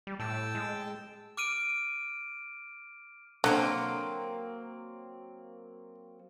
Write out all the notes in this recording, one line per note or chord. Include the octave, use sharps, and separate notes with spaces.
G3
A2 G5 A5 E6
G#3
D6 F6 D7 D#7
D3 F#3 A#3 C4